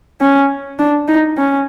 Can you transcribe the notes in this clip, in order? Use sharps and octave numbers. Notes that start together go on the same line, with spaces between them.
C#4
D4
D#4
C#4